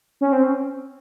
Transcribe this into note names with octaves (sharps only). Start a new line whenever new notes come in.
C#4
C4
C#4